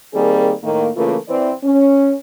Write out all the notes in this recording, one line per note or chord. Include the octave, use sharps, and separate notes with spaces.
D#3 G3 A#3 C4 G#4
A2 D#3 A3 A#3
C#3 E3 A3 A#3 F4 A#4
E3 C4 D5
C#4